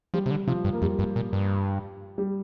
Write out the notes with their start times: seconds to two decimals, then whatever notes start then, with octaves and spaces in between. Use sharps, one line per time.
0.14 F3 G3
0.26 C3
0.31 D3
0.47 C3 F3
0.65 G2
0.73 A#3
0.82 F2 G3
0.99 G2
1.16 A#2
1.33 G2
2.18 G3